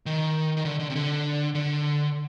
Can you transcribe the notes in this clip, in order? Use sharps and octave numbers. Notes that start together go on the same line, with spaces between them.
D#3
D#3
D3
D3
C3
D3
D3